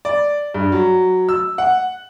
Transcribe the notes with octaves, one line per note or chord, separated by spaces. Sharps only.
D5
G2
F#3
E6
F#5